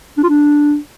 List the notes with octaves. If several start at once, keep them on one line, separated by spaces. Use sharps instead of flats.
D4
F4
D4